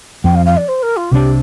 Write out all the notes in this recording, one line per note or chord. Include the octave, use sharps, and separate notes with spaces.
F2 F3 C4 G5
F5
F5
D5
C5
A#4
F4
C2 C3 G3 D4 G4